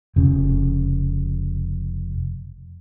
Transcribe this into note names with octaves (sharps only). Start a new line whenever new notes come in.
F1 C#3